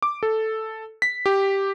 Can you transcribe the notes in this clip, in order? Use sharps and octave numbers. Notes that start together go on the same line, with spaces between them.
D6
A4
B6
G4